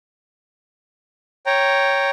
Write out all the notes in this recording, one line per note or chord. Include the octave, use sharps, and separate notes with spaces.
C#5 G5 A#5